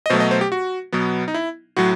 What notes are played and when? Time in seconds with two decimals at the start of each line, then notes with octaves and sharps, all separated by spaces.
0.06 D#5
0.10 B2 F#3 A3 C5
0.20 D#5
0.31 C5
0.41 G4
0.52 F#4
0.92 B2 F#3 B3
1.28 D#4
1.34 E4
1.77 A2 F#3 F#4